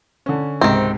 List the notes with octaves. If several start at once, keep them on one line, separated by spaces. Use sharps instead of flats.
D3 C#4
C#2 G#2 C3 D#3 C4